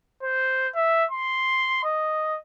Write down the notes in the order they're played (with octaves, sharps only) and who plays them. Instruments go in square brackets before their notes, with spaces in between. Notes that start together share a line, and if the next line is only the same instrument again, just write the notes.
[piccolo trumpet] C5
E5
C6
D#5